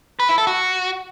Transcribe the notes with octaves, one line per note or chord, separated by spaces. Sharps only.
B4
E4
A4
F#4